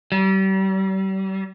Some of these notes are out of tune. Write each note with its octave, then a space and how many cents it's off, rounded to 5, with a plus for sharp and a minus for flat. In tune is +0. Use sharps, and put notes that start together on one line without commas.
G3 -35